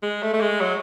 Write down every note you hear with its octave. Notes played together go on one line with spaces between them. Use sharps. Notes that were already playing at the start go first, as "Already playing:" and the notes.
G#3
A3
A3
G#3
F#3